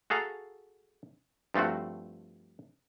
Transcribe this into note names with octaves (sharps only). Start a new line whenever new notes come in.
F#4 G#4 A4 F5 A#5
G2 F3 A3 C4 F#4